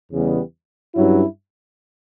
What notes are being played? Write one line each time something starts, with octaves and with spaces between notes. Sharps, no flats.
E2 C#3 E3 G3 B3
G2 F#3 C#4 E4